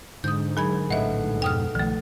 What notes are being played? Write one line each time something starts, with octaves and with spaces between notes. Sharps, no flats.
G#2 D3 D#6 G6
F#3 G#4 A#4 G#5 B5 G#6
A#1 A2 D3 A4 B4 D#5 E5 F#5
F2 B2 G5 D#6 F6
B1 D#3 F3 A3